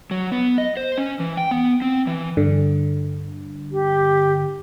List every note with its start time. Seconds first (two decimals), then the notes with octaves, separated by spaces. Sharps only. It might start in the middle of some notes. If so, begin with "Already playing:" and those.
0.11 F#3
0.32 B3
0.58 D#5
0.77 C5
0.98 C#4
1.20 E3
1.37 G5
1.51 B3
1.82 C4
2.07 E3
2.37 G2 D3
3.72 G4